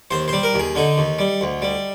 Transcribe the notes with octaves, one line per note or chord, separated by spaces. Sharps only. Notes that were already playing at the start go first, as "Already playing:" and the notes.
D#2 C5
G3 C5
A#4
D#2
G#4
D3 D#4
D#2
G3
D2
G3